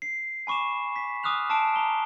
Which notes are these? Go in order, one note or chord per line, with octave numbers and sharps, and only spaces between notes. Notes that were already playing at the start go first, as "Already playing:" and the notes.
C7
G#5 B5 C#6 D6 E7
B6
G#5 D6 D#6 F6 F#6 F7
A5 D6 E6 C7 D7 E7
A#5 G7